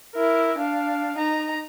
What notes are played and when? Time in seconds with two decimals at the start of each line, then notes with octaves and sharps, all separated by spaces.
0.14 E4 A#4
0.58 D4 F5
1.17 D#4 A#5